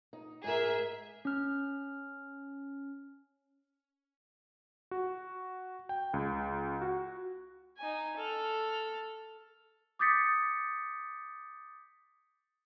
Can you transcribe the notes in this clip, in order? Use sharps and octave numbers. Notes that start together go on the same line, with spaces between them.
D#4
G#2 G#4 A#4 E5
C#4 F6
F#4
G5
C#2
F#4
D#4 G#5
A4 F6
D6 D#6 G6 A6 B6 C#7